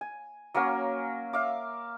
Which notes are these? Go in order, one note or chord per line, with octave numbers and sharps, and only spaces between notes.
G#5
F#3 A#3 C#4 A#4
E5 F5 D6